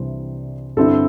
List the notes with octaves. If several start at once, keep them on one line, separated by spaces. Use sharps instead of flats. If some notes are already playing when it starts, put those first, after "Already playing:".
Already playing: C2 C3 E3 G3 D4 C5
G2 D3 C4 E4 A4